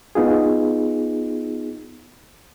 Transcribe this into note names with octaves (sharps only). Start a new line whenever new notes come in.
B3 D#4 F4 G#4